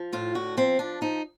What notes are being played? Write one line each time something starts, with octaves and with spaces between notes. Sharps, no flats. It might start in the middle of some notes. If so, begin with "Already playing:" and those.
Already playing: F3
A2 F4
D3 F#4
F3 C4
F3 D4
F3 D#4